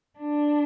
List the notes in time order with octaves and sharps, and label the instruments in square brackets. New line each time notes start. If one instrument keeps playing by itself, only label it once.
[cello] D4